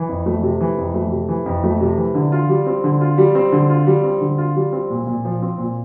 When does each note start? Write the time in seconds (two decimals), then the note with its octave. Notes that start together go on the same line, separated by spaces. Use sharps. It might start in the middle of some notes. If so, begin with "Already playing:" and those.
Already playing: E3
0.09 F2
0.26 A3
0.43 C3
0.61 E3
0.78 F2
0.94 A3
1.11 C3
1.29 E3
1.46 F2
1.64 A3
1.81 C3
1.97 E3
2.15 D3
2.32 F4
2.49 G3
2.66 C4
2.84 D3
3.01 F4
3.18 G3
3.35 C4
3.52 D3
3.70 F4
3.87 G3
4.04 C4
4.21 D3
4.38 F4
4.56 G3
4.73 C4
4.90 A#2
5.07 A#2
5.25 F3
5.42 C4
5.58 A#2